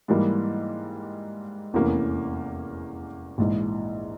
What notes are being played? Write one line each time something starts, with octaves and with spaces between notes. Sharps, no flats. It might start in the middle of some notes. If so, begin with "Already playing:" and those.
G#2 E3 G3 A#3
F1 E2 E3 A#3 C#4
A#1 G#2 E3